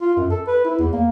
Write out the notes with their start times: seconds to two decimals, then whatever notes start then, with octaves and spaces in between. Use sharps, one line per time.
0.01 F4
0.17 F#2
0.30 A4
0.47 B4
0.65 E4
0.78 E2
0.93 A#3